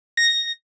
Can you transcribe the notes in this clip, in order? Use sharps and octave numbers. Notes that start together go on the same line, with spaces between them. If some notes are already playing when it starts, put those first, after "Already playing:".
A#6